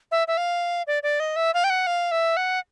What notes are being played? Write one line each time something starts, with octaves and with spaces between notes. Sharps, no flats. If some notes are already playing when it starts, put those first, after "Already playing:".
E5
E5
F5
D5
D5
D#5
E5
F5
G5
F#5
F5
E5
F#5